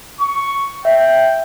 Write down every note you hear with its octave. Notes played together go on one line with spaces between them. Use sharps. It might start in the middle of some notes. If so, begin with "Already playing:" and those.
C#6
E5 G5